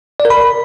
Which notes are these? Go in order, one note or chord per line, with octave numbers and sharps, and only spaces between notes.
D5
A#4
B5